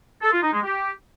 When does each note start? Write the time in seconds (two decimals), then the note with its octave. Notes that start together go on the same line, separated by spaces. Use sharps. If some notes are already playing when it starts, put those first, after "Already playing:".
0.22 A4
0.32 F4
0.43 D#4
0.53 G#3
0.63 G4